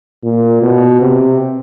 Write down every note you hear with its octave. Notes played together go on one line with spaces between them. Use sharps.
A#2
B2
C3